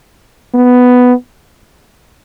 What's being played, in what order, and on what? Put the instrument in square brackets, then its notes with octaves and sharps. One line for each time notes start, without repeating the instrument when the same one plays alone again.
[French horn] B3